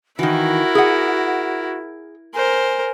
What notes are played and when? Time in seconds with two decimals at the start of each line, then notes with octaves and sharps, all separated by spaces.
0.19 D#3 E3 E4 F#4 A#4
0.75 G#4 F#5
2.34 A#4 C5 G#5